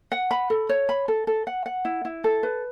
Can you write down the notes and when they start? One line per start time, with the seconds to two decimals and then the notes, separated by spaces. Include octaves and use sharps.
0.12 F#5
0.31 B5
0.50 A4
0.69 C#5
0.89 B5
1.08 A4
1.27 A4
1.47 F#5
1.66 F#5
1.85 E4
2.05 E4
2.24 A4
2.43 B4